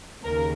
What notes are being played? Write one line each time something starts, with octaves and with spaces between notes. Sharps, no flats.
D#2 C#3 A#4